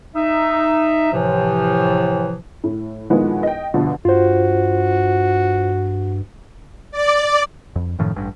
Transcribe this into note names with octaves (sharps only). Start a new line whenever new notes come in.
D#4 E5
A2 C3 E3 F3
A2
A#2 D#3 F3 G#3 B3 E4
D#5 G5
G2 B2 D3 F3
G2 F4 F#4 C5
D5
F2
F#2 A2 D#3 F3
A1 G2